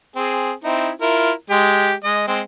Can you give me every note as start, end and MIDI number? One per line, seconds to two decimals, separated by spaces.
0.16 0.52 60
0.16 0.52 68
0.64 0.90 60
0.64 0.90 63
0.64 0.90 64
1.01 1.31 64
1.01 1.31 65
1.01 1.31 70
1.50 1.93 56
1.50 1.93 67
2.04 2.27 56
2.04 2.27 75
2.27 2.41 56
2.27 2.41 60